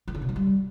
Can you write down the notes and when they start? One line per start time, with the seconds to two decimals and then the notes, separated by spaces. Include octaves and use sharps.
0.08 E3
0.15 D3
0.22 B2
0.29 F3
0.36 G3